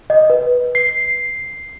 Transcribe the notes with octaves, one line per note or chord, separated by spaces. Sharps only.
D#5
B4
C7